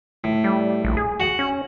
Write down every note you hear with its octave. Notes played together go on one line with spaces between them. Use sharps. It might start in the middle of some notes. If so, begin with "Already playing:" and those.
A2
G3
A#1
G#4
F#4 F#5
C#4